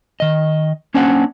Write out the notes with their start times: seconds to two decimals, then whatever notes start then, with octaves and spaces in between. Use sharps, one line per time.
0.20 D#3 D#5
0.94 A#3 C#4 D4 C5 D5 F#5